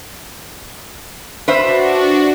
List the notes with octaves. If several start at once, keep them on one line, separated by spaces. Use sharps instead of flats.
D4 F#4 B4 C5 E5